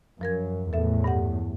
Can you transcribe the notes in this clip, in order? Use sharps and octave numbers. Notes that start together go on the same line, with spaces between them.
F#2 F3 A#4 G#6
E2 A2 A4 E5
G2 G4 F#5